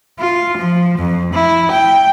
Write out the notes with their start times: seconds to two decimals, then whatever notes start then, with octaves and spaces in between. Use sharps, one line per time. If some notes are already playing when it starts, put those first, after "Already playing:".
0.19 F4
0.57 F3
0.99 F2
1.33 E4
1.72 G5